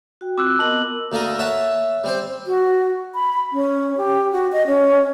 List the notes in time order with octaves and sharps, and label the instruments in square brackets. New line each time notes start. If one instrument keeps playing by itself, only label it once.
[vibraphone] F#4 G5
[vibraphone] C4 F4 [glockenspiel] D6 E6 F#6
[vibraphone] B3 A#4 D#5 [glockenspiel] A5 F#7
[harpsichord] D2 A#3 A4 A#4 D#6
C#5 E5 F#5 A5
G3 C4 C5
[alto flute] F#4
B5
C#4
G4
F#4
D#5
C#4